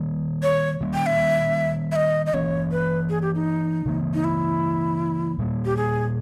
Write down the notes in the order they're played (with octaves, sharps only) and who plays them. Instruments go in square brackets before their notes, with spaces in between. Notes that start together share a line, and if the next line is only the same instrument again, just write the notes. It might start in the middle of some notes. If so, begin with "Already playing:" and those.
Already playing: [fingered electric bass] D#3 G3 A#3
[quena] C#5
[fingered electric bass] D#3 G3 A#3 C#4
[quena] G5
E5
E5
D#5
D#5
[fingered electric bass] E3 A#3 C#4 [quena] C#5
[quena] B4
G#4
G4
D#4
[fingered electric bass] C#3 E3 A#3
[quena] D#4
E4
[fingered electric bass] A#2 G3 A#3
[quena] G4
G#4